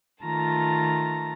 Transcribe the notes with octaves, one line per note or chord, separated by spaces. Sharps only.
D#3 A3 F4 A5 A#5